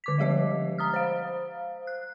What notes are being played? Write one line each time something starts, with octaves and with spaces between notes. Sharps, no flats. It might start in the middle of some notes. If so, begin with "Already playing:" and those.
D3 D6 B6
F3 G3 G#3 G4 D#5
A#5 D#6 F6
C5 F5
F#6